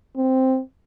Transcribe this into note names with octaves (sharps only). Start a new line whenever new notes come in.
C4